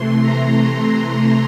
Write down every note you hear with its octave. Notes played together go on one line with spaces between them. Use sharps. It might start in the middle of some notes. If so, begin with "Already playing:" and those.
Already playing: C3 E3 A3 C6
A#5